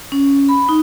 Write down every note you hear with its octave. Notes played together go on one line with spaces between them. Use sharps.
C#4
B5
D#4